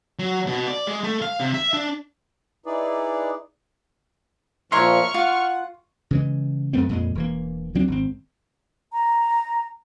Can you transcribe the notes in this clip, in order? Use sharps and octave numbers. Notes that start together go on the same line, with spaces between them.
F#3
B2
D5
G#3
A3
F5
C3
E5
D4
D#4 E4 G#4 B4 D5
A#2 F3 A#4 C#5 E5 C6 C#6 F6
F4 F#5
C#3 E3 G#3
F#2 A3 B3 C4
F2 A#2 G#3
E1 E3 A#3
D2 F#3 C4 D4
G#1 C4
A#5